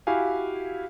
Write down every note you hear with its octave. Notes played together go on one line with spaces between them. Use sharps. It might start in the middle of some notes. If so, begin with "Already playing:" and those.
E4 F#4 G4 F5 G#5